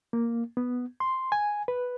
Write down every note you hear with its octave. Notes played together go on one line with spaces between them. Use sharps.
A#3
B3
C6
G#5
B4